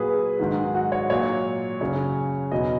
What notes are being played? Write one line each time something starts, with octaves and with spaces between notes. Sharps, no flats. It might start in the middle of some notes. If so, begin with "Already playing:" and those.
Already playing: A#2 F#3 G#4 B4
G#2 D#3 F#3
F#4
C#5
A#2 F#3 C#5
F#2 C#3 F#3 C#5
E2 B2 F#3 D#5